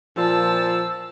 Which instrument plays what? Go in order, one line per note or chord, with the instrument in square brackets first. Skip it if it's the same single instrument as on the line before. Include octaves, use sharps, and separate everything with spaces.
[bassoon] A#2 [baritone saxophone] F3 [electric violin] A5 [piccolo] E6